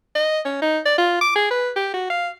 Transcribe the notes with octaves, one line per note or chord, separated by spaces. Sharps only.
D#5
C#4
D#4
D5
F4
D6
G#4
B4
G4
F#4
F5